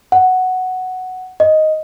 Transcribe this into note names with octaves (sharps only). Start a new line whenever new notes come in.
F#5
D#5